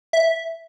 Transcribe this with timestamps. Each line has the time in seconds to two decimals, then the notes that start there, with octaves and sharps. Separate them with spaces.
0.13 E5